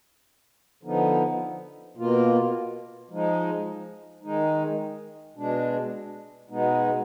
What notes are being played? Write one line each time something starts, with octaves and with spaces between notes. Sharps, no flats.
D3 F3 B3 D#4
B2 A#3 F4
F3 G#3 D#4
D#3 G#3 D#4
B2 G#3 D4
B2 G#3 B3 D#4